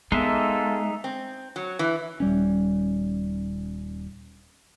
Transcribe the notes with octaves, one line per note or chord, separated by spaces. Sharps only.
G#3 A#3 B3 D#4 A4 E5
C4
F#3
E3
D#1 G3 C#4